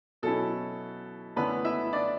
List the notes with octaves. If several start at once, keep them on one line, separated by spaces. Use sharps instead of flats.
B2 F#3 C#4 E4 A4
D3 A3 B3 C#4 E4 B4
E4 E5
D4 D5